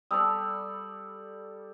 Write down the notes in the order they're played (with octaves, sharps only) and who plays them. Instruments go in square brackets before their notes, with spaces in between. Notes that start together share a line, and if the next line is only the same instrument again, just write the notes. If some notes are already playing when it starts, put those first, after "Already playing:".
[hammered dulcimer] G3 A4 D5 [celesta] D#6 E6